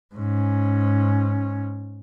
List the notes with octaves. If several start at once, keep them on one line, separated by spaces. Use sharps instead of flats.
G#2 C#4